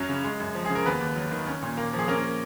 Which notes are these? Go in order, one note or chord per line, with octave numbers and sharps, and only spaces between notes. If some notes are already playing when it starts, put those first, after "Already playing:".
Already playing: F#2 F#3 C#4 C#5
C#3
G#3
F#2
F3
C#3 G#4
A#4
D#2 B3 B4
D#2
F#3
D#3
C#4
A#2
A#3
F3
G#4
A#3 C#4 A#4